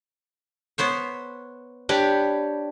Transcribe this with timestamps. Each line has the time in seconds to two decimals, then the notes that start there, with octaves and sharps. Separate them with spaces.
0.78 B3 C5 C#5
1.89 D4 G4 B4 C#5